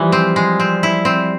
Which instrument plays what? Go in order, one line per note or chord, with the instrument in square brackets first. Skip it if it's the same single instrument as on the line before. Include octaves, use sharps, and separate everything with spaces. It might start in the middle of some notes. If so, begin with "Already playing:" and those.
Already playing: [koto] E3 G#3 [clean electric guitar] F3 G3
[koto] C4
G#3
C4
E4
C4